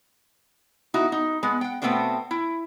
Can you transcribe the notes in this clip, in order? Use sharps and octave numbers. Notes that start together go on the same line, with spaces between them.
D#4 E4 F#4
D#4
G#3 B3
F#5 G5
B2 A3 B3 C4 D4 G5
E4